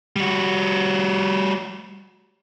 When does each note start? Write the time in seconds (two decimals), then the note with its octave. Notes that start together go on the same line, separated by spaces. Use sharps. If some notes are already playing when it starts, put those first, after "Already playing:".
0.16 G3 F#4